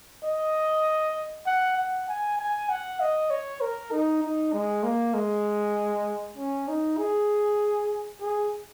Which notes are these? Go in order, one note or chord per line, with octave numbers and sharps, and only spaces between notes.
D#5
F#5
F#5
G#5
G#5
F#5
D#5
C#5
A#4
D#4
D#4
G#3
A#3
G#3
C#4
D#4
G#4
G#4